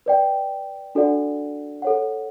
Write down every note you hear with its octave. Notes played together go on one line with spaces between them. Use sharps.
B4 D5 G5
D4 F#4 A4 D5 F#5
A4 C#5 F#5